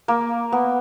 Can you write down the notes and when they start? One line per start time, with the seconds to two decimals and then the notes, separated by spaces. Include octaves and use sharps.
0.08 A#3
0.52 B3